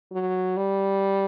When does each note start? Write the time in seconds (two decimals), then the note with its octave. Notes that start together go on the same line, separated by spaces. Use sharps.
0.12 F#3
0.57 G3